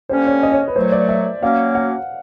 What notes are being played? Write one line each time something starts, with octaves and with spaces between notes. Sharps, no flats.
D3 G3 A#3 C#4 C5
C#5
D#5
C#5
B4
A#2 F#3 A3 C5
D5
E5
F#3 A#3 C#4 F5
F#5